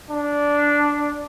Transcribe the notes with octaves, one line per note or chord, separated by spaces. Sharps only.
D4